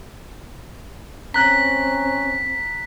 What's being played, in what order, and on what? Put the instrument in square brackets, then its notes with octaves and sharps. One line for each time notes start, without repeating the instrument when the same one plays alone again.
[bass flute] C4 [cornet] C#4 [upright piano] A#5 F#6 [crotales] B6